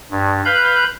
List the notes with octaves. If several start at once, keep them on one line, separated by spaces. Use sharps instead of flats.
G2
B4 F5 B5 G6